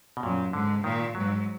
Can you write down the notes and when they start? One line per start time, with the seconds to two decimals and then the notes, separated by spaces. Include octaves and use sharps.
0.17 B2
0.23 F#2 A#2
0.53 G#2 D3
0.84 A#2 D#3
1.15 G#2 F#3